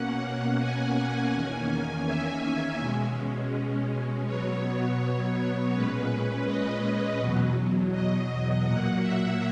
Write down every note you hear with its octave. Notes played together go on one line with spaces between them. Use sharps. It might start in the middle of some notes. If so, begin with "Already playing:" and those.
Already playing: B2 A#3 C#4 F#5
G#5
G#5
E2 D#3 A#3 C#4 G#5
E5
B2 G#3 C#4
B2 F#3 B3 C#5
A#2 G#3 C#4 B4
D#5
E2 B2 F#3
D#5
A#2 F#3 A#3 F#5
E5